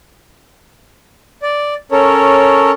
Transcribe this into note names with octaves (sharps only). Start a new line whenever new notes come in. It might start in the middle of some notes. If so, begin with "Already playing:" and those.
D5
C#4 A4 A#4 C#5